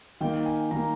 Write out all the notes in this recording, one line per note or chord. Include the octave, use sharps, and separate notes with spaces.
D#3 A#3 G5
G#5
D#3 A#3 A#5